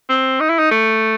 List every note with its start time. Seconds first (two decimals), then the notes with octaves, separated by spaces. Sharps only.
0.09 C4
0.40 D#4
0.49 E4
0.58 D#4
0.71 A3